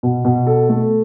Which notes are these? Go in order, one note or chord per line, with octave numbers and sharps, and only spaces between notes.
B2
B2
A4
A3